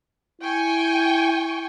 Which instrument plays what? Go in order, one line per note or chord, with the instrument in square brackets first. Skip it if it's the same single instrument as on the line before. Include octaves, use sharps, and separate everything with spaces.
[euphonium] E4 [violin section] G5 G#5 C#6